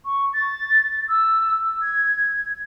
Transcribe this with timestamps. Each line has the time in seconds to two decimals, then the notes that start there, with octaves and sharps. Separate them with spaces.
0.05 C#6
0.34 A6
1.09 E6
1.82 G#6